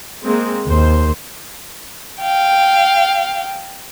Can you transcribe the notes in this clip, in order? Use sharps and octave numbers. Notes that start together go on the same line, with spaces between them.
G#3 A#3 C4
D#2 C5
F5 G5